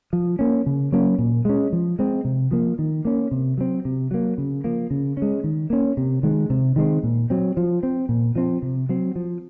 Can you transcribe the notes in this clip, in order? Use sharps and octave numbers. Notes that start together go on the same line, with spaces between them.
F3
A#3 C#4
C#3
F#3 A#3 C#4
A#2
G#3 C#4
F3
G#3 C4
C3
F3 A#3
D#3
A#3 C#4
C3
F#3 C4
C3
F#3 A#3
C#3
F3 A#3
C#3
G#3 C#4
D#3
A#3 C#4
C3
D#3 G#3
C3
D#3 G#3 C4
A#2
F#3 C4
F3
C4
A#2
F3 C4
C3
F#3 C4
F3